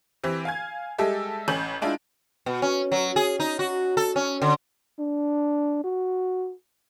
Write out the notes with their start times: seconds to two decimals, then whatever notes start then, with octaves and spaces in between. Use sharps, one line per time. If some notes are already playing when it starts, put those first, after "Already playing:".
0.24 E3 C4 G4
0.45 F5 G#5 G#6
0.98 G3 G#3 G4 A4 E5
1.48 A1 C#4 G6 F#7
1.82 G#3 D4 E4 F4
2.46 B2
2.62 C#4
2.92 F#3
3.16 G#4
3.40 D#4
3.59 F#4
3.97 A4
4.16 C#4
4.42 D3
4.99 D4
5.84 F#4